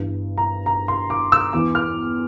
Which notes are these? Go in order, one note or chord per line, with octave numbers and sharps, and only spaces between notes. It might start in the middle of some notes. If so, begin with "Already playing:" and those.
Already playing: G1 G2 E3
A#5
A#5
C6
D6
E6
E2 E3 D6
F6